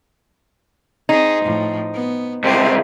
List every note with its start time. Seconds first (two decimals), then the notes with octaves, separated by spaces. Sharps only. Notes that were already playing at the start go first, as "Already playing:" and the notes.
1.09 C4 D#4 G#4
1.44 A2 F3
1.94 B3
2.44 C#2 C3 G4 C5